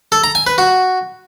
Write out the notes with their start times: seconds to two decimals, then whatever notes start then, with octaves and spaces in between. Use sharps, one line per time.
0.12 A4
0.24 A#5
0.35 G#5
0.47 B4
0.58 F#4